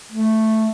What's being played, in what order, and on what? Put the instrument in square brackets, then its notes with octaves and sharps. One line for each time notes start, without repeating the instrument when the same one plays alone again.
[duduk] A3